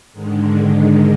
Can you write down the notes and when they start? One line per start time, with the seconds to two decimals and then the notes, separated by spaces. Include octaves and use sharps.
0.13 G#2 D3 D#3 G#3